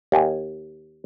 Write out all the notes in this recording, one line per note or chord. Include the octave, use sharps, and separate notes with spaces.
D#2 G#5